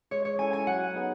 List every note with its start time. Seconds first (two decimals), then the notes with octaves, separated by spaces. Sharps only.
0.11 G#3 C#5
0.25 C#5
0.38 C#4 E4 A4 G#5
0.53 G#5
0.67 F#3 F#5
0.95 B3 D#4 G#4 B4